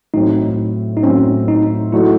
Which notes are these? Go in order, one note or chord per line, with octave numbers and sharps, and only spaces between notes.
A2 F#3 C4 D#4
D#4
A2 F#3 C4 C#4
D#4
F#3 A3 D#4 E4 F#4 A4